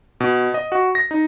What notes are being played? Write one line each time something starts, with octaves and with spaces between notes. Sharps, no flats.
B2
D#5
F#4
A#6
D#4